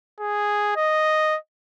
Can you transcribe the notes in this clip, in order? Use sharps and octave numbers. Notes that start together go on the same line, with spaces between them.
G#4
D#5